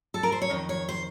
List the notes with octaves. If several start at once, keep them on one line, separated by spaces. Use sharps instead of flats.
A4
A#4
C5
C#5
F2 D#3 D#5
C#5
C5